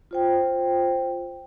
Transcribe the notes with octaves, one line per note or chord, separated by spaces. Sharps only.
F4 C5 G5